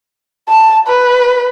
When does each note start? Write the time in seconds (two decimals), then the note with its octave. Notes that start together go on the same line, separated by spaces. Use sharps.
0.49 A5
0.88 B4